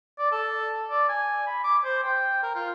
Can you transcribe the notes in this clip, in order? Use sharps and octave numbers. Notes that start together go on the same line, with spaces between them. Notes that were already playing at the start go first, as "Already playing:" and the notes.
D5
A4
D5
G#5
B5
D6
C5
G5
A#4
F4